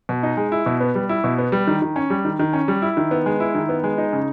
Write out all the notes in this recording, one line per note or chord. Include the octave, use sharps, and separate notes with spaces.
B2
D#4
G#3
E4
B2
B3
G3
E4
B2
B3
G3
D#3
D#3
C#4
G3
D#3
D#3
C#4
G3
E4
D#3
B3
G#3
E4
D#3
B3
G#3
D#4
C#3